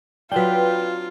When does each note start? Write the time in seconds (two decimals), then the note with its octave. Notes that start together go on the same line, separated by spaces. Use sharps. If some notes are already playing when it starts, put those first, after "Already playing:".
0.31 F#3 C4 D4 F4 B4 G5